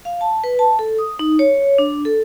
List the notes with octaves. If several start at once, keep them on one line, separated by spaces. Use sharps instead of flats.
F5
A5
B4
A5
A4
D#6
D#4
C#5
D4
A4